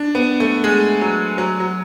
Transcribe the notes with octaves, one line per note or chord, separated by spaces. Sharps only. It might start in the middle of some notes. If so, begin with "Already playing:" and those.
Already playing: D4
B3
A3
G#3
F#3
F#3
F#3